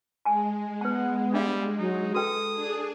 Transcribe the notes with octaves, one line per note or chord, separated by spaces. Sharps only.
G#3 G#5 A5
B3 B4 F#5 A5
G3 D4 E5 F5
F#3 D#4
F#4 A4 B4 G5 D#6
D4 G#4